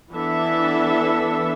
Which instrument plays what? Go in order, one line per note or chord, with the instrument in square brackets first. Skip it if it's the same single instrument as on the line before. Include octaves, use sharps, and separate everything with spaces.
[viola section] E3 B3 D4 A4 E5